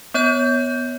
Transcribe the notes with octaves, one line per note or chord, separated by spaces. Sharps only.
B3 C#5 G6